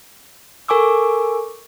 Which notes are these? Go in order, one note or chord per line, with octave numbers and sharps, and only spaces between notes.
A4 A#4 G#5 C#6 D6 E6